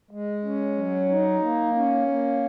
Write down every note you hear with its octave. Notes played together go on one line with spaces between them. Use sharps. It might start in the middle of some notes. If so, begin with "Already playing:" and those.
G#3
C#4
F#3
D#4
A#3
C#4
A#3